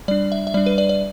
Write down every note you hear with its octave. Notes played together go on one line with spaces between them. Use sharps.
G3 D4 D5
E5
E5
G3 D4 D5
B4
D5
D5